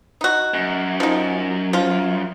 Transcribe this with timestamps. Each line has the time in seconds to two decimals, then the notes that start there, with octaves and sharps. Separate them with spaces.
0.21 D#4 F#4
0.54 F#2
1.00 F3 D#4
1.73 F3 F4